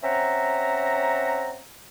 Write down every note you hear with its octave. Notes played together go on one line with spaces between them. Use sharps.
C4 C#4 E5 F#5 A#5